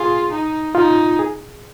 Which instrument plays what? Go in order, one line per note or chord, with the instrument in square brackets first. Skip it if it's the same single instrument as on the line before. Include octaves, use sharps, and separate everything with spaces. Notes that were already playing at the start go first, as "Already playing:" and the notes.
Already playing: [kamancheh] F4 [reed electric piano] G#4
[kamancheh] D#4
[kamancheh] D#4 [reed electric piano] F4
[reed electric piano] G#4